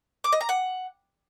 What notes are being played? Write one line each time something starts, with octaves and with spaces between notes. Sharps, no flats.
D6
D#5
A#5
F#5